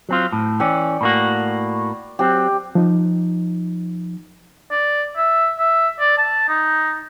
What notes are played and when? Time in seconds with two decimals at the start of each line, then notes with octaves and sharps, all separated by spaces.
0.09 F#3 C4 F4
0.32 A2
0.60 E3 C#4 D5 G5
1.01 A2 A#3 F#4
2.19 F#3 C4 G4
2.75 F3 D#4
4.71 D5
5.17 E5
5.58 E5
6.00 D5
6.18 A5
6.48 D#4